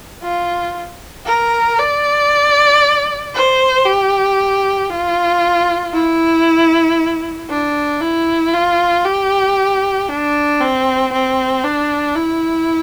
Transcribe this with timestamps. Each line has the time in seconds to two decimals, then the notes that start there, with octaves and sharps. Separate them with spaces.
0.23 F4
1.26 A#4
1.79 D5
3.34 C5
3.85 G4
4.90 F4
5.94 E4
7.49 D4
8.01 E4
8.53 F4
9.04 G4
10.09 D4
10.60 C4
11.13 C4
11.64 D4
12.16 E4